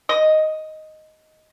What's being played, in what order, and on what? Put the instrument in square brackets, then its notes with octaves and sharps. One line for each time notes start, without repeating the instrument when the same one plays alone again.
[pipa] D#5